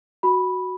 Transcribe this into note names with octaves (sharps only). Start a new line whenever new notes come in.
F#4 B5